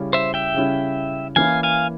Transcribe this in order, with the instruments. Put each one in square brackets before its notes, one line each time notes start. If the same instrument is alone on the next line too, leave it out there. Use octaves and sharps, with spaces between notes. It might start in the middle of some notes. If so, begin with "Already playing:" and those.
Already playing: [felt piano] C#3 G3 C#4 E4
[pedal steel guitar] C5 E5
E5 G5
[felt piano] C#3 G3 C#4 E4
[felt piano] E3 A#3 C#4 E4 [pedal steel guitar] F5 G#5
[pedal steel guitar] F5 G#5